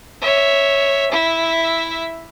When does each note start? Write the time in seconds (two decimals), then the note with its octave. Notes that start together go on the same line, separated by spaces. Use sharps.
0.21 C#5 E5
1.11 E4 E5